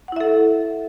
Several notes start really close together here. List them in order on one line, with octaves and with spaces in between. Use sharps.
F#5 E4 E5 A4